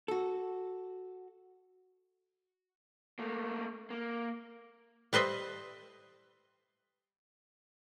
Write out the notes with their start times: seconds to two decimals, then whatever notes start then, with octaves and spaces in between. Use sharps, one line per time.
0.08 F#4 A4
3.19 A3 A#3
3.90 A#3
5.13 G3 B4 C5 D#5 E5